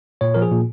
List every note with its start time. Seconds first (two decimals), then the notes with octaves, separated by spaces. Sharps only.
0.21 A#2 C#5
0.34 F3 A#4
0.42 G#4
0.52 A#2